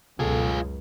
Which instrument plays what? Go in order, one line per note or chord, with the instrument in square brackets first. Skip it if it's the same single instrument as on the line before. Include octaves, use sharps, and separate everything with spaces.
[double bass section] C#2 F#2 [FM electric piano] B2 A4 [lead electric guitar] F4 G#4